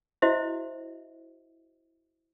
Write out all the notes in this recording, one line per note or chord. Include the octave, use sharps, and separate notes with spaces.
E4 F#4 C5 D#5 E5